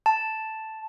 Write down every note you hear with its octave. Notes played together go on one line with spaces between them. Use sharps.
A5